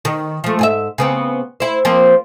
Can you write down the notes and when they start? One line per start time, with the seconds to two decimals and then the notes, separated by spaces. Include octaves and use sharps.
0.05 D#3
0.44 F3 A3
0.59 G#2 G#4 E5
0.98 C#3 B3 C4
1.60 E4 C5
1.85 F3 A#3 C4